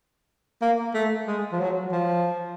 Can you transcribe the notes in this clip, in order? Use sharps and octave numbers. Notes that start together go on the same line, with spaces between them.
A#3
A3
G#3
F3
F#3
F3